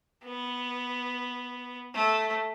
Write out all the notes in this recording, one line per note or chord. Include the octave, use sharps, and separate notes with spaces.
B3
A3